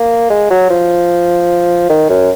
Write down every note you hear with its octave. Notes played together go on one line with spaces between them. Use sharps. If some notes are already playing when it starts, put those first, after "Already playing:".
Already playing: A#3
G#3
F#3
F3
D#3
F#2